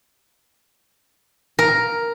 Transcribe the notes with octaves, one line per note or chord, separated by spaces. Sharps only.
A#4